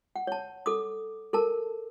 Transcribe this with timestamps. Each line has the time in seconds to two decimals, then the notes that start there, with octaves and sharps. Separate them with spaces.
0.16 F#5
0.27 C#5 A5
0.66 A4 D6 D#6
1.33 A4 A#4 A5